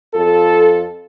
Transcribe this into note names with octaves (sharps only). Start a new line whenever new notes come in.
F2 F4 A4